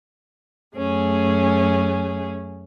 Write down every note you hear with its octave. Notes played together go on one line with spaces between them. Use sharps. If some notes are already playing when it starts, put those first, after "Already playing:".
F#2 A3 C#4 G#4